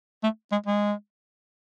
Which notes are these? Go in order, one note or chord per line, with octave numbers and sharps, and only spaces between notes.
A3
G#3
G#3